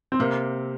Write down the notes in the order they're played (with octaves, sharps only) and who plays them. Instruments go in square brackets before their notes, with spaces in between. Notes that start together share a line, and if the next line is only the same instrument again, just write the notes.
[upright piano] C4
[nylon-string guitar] C3 [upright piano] A#3